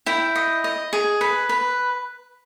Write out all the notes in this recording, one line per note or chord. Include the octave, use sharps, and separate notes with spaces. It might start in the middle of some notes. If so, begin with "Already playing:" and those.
E4 G5
D#5
D#5
G#4
B4
B4